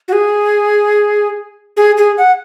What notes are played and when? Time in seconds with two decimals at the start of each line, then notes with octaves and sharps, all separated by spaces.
0.08 F#4
0.13 G#4
1.77 G#4
1.97 G#4
2.18 F#5